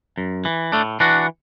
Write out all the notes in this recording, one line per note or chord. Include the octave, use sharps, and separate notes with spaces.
F#2
E3
A2 A3 D4
E3 D4 F#4